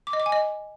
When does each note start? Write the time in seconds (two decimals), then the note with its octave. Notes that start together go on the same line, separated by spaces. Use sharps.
0.07 D6
0.13 D#5
0.20 D6
0.26 G#5
0.32 D#5